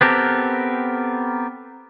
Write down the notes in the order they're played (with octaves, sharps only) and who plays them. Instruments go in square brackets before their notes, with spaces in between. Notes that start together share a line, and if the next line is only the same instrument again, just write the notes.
[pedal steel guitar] B3 C4 G4 A4 A#4